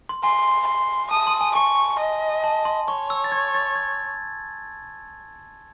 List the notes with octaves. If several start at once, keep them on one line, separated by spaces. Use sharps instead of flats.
C6
G#5 C6
C6
A5 D#6
C6
G#5
G#5 C#6
D#5
A5
C6
C#5 C#6
E6
A6
G#6
A6
G#6